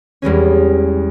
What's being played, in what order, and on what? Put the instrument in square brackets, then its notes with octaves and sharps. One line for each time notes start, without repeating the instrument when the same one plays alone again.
[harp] E2 G3 G#3 C#4